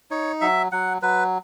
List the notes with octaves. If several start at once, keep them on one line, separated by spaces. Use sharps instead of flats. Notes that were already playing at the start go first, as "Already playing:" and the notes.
D#4 C#5
F#3 E5
F#3 F#5
F#3 B4